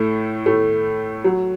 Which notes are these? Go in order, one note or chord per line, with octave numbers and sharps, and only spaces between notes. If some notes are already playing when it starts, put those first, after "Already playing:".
Already playing: A2 A3
A2 A3
F#3